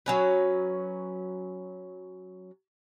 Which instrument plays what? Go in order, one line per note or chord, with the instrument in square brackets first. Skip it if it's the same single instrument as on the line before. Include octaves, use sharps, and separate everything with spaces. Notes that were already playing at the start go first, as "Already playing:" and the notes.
[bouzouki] F#3 C#4 B4